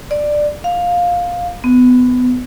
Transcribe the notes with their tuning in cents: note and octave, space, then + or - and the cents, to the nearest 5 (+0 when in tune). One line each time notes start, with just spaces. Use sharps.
D5 +10
F5 +15
B3 +20